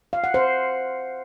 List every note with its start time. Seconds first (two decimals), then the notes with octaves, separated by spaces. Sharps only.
0.13 F5
0.24 F#5
0.34 C5